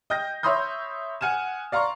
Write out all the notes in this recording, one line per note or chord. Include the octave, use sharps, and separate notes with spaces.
D#5 G5 G6 A#6
C#5 E5 B5 C6 D#6 G6
F#5 G#5 F6 E7
D5 F5 A#5 C6 C#6